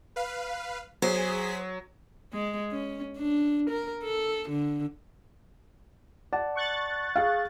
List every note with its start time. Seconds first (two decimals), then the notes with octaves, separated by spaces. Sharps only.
0.16 B4 F5
1.02 F#3 G#4 C5 B6
2.33 G#3
2.72 C#4
3.18 D4
3.70 A#4
4.03 A4
4.49 D3
6.33 D5 F#5 A5
6.56 C#6 F#6 A6
7.16 G#4 F5